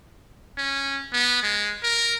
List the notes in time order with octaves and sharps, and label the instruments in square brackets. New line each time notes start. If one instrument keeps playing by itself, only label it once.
[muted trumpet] C#4
B3
G#3
A#4